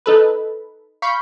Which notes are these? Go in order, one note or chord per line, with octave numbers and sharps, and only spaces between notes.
D#4 A4 B4
F5 B5 C#6 G6